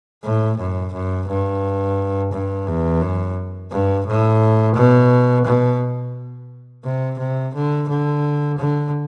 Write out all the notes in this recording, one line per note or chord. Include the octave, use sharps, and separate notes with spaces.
A2
F#2
F#2
G2
G2
E2
F#2
G2
A2
B2
B2
C3
C3
D3
D3
D3